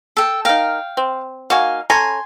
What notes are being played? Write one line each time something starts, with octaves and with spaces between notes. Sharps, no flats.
A4 G5
D#4 A#4 F5 G5
C4
A#3 D#4 F#4 F5 G#5
C#4 A4 G#5 A#5 C6